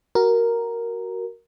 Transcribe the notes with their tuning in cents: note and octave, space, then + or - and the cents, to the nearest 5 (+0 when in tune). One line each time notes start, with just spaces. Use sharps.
F#4 +15 A#4 +0